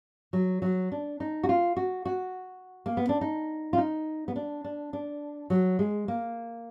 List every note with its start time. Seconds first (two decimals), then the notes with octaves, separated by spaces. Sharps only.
0.33 F#3
0.62 F#3
0.92 D4
1.20 D#4
1.43 F#4
1.49 F4
1.77 F#4
2.05 F#4
2.86 A#3
2.97 B3
3.09 D4
3.21 D#4
3.73 F4
3.78 D#4
4.28 B3
4.36 D4
4.64 D4
4.93 D4
5.50 F#3
5.79 G#3
6.08 A#3